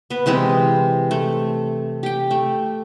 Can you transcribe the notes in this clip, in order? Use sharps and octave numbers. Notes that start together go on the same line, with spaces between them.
B3 B4
C3 E3 G#3 C4
A3
G4 G5
A3